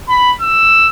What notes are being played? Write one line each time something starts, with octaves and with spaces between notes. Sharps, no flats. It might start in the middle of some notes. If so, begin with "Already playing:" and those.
B5
E6